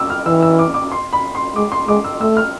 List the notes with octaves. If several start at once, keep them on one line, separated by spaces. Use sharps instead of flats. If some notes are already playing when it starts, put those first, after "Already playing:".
Already playing: D6 E6
F6
E3 E6
E6
D6
D6
C6
B5
C6
G#3 D6
C6
G#3 D6
E6
A3 E6
F6